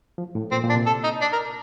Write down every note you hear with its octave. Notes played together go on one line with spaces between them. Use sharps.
F3
A2
A#2 C4
A#2
D4
C3
A4
D#4
D4
A#4